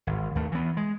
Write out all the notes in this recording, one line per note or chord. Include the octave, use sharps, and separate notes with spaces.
G#1
D#2 A3
E3 B3
G#3